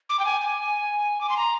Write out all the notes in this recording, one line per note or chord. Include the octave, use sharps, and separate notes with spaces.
D6
G5
G#5
G#5
D6
C6
A#5